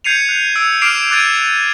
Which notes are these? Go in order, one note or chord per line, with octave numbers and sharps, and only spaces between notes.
G6 G#6 C7 C#7 D#7 F7
F#6
E6 C#7 D7
D6 F6 C7 D7 E7 F7
D6 F#6 G#6 A6 D7 D#7